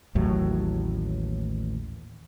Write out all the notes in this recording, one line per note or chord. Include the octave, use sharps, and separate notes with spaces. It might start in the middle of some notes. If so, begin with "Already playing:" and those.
A1 D#2 A2 F#3